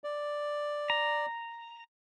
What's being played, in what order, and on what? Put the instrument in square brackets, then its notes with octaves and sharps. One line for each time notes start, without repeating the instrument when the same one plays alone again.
[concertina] D5
[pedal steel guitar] A#5